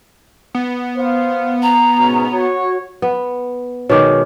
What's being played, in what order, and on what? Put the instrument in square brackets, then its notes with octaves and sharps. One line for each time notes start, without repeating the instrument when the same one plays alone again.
[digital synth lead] B3
[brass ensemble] C5 F5
[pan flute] A#5
[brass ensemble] G#2 B2 C#4
F#4 C#5
[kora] B3
[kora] B2 D#3 G#3 [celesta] C#5 D6